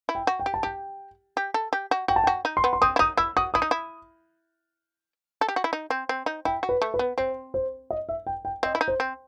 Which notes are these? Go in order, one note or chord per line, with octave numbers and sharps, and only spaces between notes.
E4
G5
F#4
G5
G4
A5
G4 G5
G4
A4
G4
F#4
F#4 G5
A5
G5
F#4
D#4
C6
B3
C6
C4 D#6
E4
D#4 D#6
E4 E6
F#4 D#6
E4 D#6
D#4
E4
A4
G4
F#4
E4
D#4
C4
C4
D#4
E4 G5
F#4
B4
A3
B4
B3
C4 C5
C5
D#5
E5
G5
G5
C4 D#5
E4
D#4
C5
C4